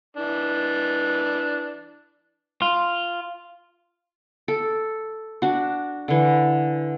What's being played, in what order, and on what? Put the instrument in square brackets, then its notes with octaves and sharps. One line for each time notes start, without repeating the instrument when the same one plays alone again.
[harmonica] E3 D4
[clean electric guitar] F4
[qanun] A4
D4 F#4
D3 E3